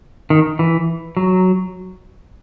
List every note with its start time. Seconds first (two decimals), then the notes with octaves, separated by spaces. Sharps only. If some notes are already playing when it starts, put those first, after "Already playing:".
0.30 D#3
0.59 E3
1.17 F#3